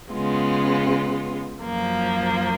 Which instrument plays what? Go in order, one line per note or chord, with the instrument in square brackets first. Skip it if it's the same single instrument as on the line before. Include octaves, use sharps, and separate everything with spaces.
[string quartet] C#3 G#3 B3 F4
F#2 F3 A#3